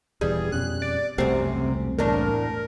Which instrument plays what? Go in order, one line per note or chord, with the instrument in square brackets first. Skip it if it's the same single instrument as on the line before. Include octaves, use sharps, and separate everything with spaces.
[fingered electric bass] D#1 E2 E3 [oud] G3 [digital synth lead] G#4
[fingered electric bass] F2 B2 C#4 [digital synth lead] F#6
[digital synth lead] D5
[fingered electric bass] E1 C2 A3 [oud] F#2 C4 [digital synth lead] C3
[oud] E2 A2 D4 [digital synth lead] A#4